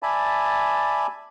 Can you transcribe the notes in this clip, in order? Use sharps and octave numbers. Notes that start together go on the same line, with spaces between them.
D5 E5 G#5 A5 B5